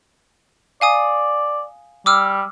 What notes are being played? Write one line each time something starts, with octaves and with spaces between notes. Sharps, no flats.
D5 F5 G#5 D#6
G3 D6 E6 F6